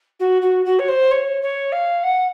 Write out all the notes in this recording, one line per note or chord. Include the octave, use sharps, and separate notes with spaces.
F#4
F#4
F#4
C#5
C5
C#5
C#5
F5
F#5